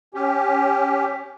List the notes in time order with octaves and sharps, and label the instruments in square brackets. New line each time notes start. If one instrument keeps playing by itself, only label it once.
[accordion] C#4 G4